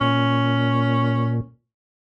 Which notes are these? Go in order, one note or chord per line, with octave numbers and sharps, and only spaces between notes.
A#2 C#4